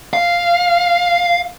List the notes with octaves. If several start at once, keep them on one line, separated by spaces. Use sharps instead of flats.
F5